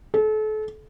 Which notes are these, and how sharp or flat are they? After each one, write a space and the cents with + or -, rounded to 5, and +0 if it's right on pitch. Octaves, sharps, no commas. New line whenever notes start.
A4 -35